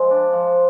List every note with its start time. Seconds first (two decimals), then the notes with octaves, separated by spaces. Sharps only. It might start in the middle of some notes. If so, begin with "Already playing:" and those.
Already playing: F3 G#3
0.11 D4
0.33 F3